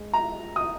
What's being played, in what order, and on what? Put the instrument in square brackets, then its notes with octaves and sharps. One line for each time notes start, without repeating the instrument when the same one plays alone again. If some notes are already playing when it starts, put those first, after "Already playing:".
Already playing: [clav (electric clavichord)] G#3
[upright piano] A#5
D#6